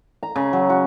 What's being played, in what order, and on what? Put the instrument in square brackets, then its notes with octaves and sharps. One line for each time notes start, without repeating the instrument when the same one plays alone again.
[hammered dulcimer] A#5
C#3
F#3
F#4